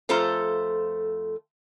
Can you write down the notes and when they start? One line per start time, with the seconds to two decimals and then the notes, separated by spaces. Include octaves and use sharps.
0.09 F2 A3 F4 A4 C5 A#5